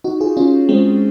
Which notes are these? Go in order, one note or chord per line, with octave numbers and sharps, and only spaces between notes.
D#4 F#4
F4 G#4
C#4 F4
G#3 C4